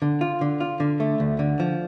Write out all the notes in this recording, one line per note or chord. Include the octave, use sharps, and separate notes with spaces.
D3
F4
D3
F4
D3
A3
D2
D3
F3